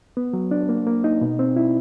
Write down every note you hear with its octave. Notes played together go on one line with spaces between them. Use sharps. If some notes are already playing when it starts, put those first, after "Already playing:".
B3
F#3
D4
A#3
A#3
D#4
B2
C4
E4